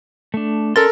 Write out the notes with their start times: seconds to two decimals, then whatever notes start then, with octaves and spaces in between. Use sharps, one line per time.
0.34 A3 D4
0.76 C#4 A4 A#4 D5 C6 A6